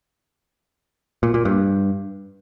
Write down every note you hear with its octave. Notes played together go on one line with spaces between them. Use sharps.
A#2
A#2
G2